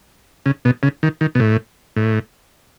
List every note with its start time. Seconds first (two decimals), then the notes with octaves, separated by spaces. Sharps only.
0.46 C#3
0.65 B2
0.83 C#3
1.03 D#3
1.21 D#3
1.35 B2
1.40 A2
1.96 A2